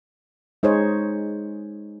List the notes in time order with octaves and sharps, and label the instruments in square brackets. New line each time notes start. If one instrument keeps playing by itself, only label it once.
[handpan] G#3 D#4 G#4 C5 C#5